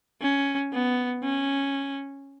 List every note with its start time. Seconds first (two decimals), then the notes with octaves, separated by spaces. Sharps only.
0.21 C#4
0.72 B3
1.23 C#4